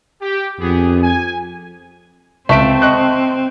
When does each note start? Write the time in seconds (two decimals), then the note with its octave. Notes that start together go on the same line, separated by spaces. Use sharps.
0.22 G4
0.60 F2 B3 G4 G#4
1.02 G#5
2.49 C#2 A3 C4 E5 D7
2.82 D#5 C#6 F#6